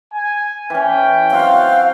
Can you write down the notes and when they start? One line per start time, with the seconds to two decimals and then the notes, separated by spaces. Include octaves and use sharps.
0.13 G#5
0.70 E3 C#4 G5
1.31 F#3 C4 F#4 F5